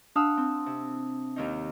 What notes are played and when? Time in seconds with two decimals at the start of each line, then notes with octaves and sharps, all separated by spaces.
0.16 D4 F5 F#5 A5 D#6 E6
0.37 C4
0.66 C3
1.36 D#2 D#3 D#4